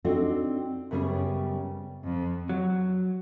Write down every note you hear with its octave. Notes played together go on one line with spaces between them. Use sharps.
C4 D4 D#4 F#4 A4 D5
F#2 C#3 G3 B3 C#4
F2
F#3